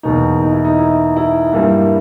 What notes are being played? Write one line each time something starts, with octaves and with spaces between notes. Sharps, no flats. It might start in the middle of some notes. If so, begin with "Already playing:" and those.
E2 B2 A#3 D#4
D#4
E4
D#4
E4
E4
G2 G3 A#3 E4